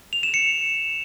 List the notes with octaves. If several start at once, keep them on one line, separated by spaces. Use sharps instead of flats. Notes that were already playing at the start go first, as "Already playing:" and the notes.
F7
E7
C#7